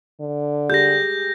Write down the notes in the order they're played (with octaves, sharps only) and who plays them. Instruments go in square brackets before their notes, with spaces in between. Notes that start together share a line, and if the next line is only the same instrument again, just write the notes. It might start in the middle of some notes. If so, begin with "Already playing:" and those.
[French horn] D3
[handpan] G4 G#4 [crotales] G6 A#6